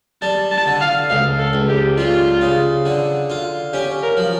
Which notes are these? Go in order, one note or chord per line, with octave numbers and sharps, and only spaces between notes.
G3 A5
A5
D3
F5
C#2 F5
A4
C#2
G4
G3 F4
C#3
D3
F4
C#4 G4
A#4
F3